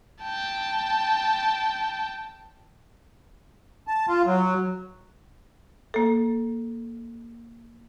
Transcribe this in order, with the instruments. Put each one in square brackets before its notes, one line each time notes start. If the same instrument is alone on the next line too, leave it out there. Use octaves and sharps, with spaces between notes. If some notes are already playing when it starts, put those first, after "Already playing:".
[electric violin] G5 A5
[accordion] A5
F4
F#3
[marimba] A#3 A4